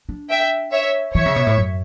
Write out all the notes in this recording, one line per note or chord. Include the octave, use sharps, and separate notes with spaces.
D4
E5 G5
C#5 E5
E3 C#5 E5
C#3
B2
A2
F#2